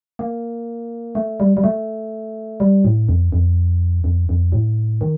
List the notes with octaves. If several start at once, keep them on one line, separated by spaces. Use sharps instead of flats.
A#3
A3
G3
G3
A3
G3
A2
F2
F2
F2
F2
A2
D#3